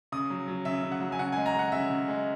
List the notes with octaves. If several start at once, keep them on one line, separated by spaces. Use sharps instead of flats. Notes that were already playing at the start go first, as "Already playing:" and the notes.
C#3 D#6
F#3
F#3
C#3 E5
C#3
F#5
F#3
G#5
C#3 F#5
G#3 G#5
A#5
G#3 F#5
C#3 E5
C#3
G#3